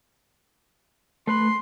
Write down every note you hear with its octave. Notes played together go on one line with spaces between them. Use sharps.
A3 B4 B5 C6